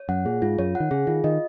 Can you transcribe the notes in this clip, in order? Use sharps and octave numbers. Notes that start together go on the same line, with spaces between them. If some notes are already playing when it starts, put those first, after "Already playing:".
Already playing: C#5
F#2 F#5
A#2 G#4
G#2 F4
F#2 C#5
F#5
D#3
C#3 G#4
D#3 F4
D#3 D#5